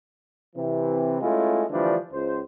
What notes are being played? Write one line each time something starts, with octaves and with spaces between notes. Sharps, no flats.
C3 E3
G#3 A3 C#4 E4 F4
D3 E3 F3 G3 A3 D4
C#2 C5